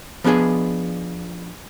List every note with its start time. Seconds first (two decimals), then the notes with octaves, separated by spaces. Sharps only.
0.24 F3 B3 D4 G#4 D#5